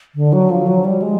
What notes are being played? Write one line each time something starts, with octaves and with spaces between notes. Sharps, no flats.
D3
F#3
F3
F#3
G3
G#3